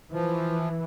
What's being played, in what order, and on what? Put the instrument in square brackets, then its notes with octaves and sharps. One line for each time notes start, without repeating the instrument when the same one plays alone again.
[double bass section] E3 [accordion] F3